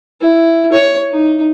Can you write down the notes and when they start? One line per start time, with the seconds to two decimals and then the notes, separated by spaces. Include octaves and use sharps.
0.21 E4
0.72 C#5
1.11 D#4